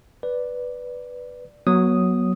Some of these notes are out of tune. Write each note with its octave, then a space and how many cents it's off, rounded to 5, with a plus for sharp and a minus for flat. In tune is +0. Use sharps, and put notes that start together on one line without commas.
B4 +0 D5 +0
F#3 +0 B3 -35 D#6 +0